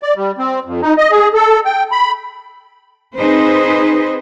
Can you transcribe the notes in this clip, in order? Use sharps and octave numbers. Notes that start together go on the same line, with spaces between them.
D5
G3
C4
F2
D#4
D#5
G#4
A4
G5
B5
C4 D#4 G#4 B4 C5